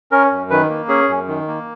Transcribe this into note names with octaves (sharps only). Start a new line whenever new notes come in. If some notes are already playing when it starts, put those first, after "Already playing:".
C#4 A#4
F#2
D#3 B4
A#3
C#4 G#4
F#2
D#3
A#3